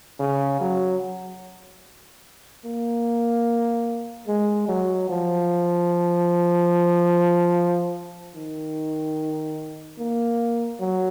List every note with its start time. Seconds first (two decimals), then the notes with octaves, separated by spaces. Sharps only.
0.20 C#3
0.61 F#3
2.65 A#3
4.28 G#3
4.68 F#3
5.09 F3
8.35 D#3
9.99 A#3
10.80 F#3